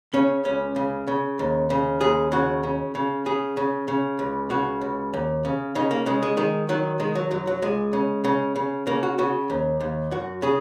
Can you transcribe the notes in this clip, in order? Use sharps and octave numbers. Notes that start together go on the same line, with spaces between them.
C#3 C#4
C#2 C#4
C#3
C#3
D#2
C#3
D#2 G#4
C#3 F#4
C#3
C#3
C#3 G#4
C#3
C#3
C#2
C#3 F#4
C#2
D#2
C#3
C#3 D#4
A#3
C#3 G#3
G#3
D#3 G#3
D#3 F#3
D#3 G#3
F#3
F#2 F#3
F#3
C#2 G#3
C#3
C#3
C#3
C#3 A#3
F#4
C#3 F#4
D#2
D#2
F#2 F#4
C#3 G#4